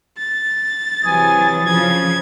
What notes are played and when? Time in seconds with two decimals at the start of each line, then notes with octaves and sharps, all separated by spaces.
0.18 A6
1.05 C3 E3 F#3 G#5 D#6
1.65 C#3 F3 G#6